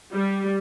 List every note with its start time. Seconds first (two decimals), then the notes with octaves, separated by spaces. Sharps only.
0.13 G3